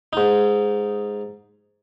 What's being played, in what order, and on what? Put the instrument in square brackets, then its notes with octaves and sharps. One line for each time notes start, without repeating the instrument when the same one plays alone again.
[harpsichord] G#2 D#4